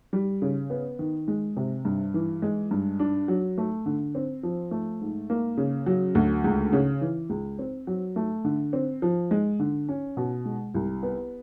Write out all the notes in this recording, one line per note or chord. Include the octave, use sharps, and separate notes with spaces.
G3
C#3
B3
D#3
G#3
C3
G2
E3
G#3
G2
D4
F#3
A3
D3
C4
F3
A3
G#2
A#3
C#3
F#3
D2
C#2
C#3
E3
C#2
C4
F#3
A3
D3
C4
F3
G#3
D3
C#4
B2
G#3
C2
B3